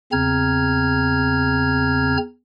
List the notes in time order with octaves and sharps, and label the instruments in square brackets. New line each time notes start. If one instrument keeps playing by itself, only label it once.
[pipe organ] E2 C#3 C4 A#5 F6 G#6